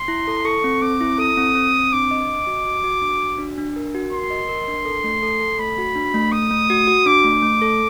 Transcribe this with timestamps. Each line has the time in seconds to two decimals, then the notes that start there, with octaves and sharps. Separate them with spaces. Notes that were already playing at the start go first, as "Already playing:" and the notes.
Already playing: C6
0.08 E4
0.27 A4
0.45 A4 C#6
0.64 C4
0.82 C4 D6
1.01 E4
1.18 A4 D#6
1.37 C4
1.55 C4
1.73 C4
1.93 D4 D6
2.11 D#5
2.29 D#5
2.47 F#4
2.66 F#4
2.84 F#4
3.02 D4
3.20 F#4
3.39 D4
3.58 D4
3.76 A#4
3.95 F#4
4.12 A#4 C6
4.30 D#5
4.49 A#4
4.68 D4
4.85 A4
5.04 A3
5.23 A4
5.40 A4
5.59 A3 B5
5.78 F#4
5.95 D4
6.14 A3
6.32 A3 D#6
6.51 A3
6.70 F#4
6.87 F#4
7.06 D4 D6
7.24 A3
7.42 A3
7.62 A4